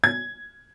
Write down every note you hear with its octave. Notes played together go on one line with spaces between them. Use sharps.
G#6